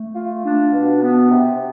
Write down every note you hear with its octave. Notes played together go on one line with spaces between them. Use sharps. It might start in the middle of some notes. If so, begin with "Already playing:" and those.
Already playing: A3
F4
D4
B2
B3
C3